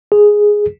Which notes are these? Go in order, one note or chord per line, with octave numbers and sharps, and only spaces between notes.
G#4